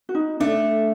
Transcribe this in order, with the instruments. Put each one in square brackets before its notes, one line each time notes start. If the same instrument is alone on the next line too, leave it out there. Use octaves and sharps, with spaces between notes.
[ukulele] F#4
D#4
[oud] A3 [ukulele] D4